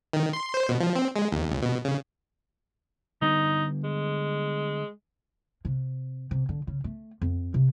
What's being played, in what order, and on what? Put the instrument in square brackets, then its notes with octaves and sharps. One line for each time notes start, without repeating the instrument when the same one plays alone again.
[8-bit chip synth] D#3
C6
C5
B2
F3
C4
G#3
D#2
C#2
B2
C#3
[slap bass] D3 G3 B3 [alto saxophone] D#4
[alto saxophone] G#3
[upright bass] C3
C3
D3
C#3
A3
F2
C3